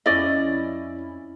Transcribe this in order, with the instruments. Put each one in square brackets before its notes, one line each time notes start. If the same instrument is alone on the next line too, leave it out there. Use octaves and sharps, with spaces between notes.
[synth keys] F2 C#4 E4 [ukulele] D5 D#5